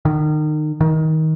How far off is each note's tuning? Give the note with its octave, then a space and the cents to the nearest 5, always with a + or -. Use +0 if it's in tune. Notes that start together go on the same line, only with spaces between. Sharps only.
D#3 -30
D#3 +20